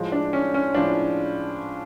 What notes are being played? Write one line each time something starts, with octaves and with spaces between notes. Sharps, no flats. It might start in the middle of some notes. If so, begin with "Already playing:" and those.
Already playing: A2 F3 G#3
D4
C#4
C#4
A2 F3 G#3 D4